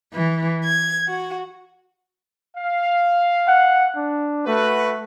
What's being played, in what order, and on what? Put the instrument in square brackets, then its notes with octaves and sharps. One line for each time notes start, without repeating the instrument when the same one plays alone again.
[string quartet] E3
G#6
F#4
[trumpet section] F5
[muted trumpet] F#5
D4
[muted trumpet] A3 [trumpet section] F#4 B4